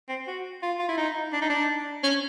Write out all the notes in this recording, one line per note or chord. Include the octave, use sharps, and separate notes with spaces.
C4
F#4
F4
F4
E4
D#4
D4
D#4
D4
C#4